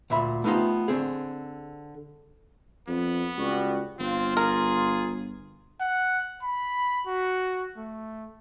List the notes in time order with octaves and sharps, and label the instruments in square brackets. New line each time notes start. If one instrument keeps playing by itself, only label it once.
[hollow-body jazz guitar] D2 A#2 E5 B5
A3 B3 D#4 F4 G4
D3 C4 G#4
[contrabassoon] F2 [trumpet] B3
[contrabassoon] C#2 [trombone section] G3 F#4
[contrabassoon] G1 [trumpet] C4 [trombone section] F4
[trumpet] G#4 [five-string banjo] A#4
[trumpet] F#5
B5
F#4
A3